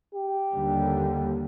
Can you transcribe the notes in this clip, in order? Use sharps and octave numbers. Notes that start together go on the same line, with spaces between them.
G4
D#2 D3 G3